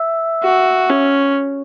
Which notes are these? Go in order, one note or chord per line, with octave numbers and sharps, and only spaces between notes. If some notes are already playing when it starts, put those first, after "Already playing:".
Already playing: E5
F#4
C#4